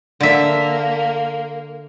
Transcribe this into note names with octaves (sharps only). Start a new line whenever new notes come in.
D3 A#3 E5